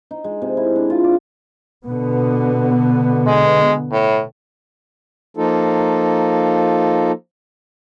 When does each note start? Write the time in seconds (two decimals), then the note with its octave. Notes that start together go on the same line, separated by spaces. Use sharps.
0.11 D#4
0.24 G#3
0.42 C3
0.57 E4
0.76 D4
0.90 F4
1.04 D5
1.86 B2 D3 B3
3.27 G#3
3.92 A2
5.37 F3 A#3 D#4 F4 A4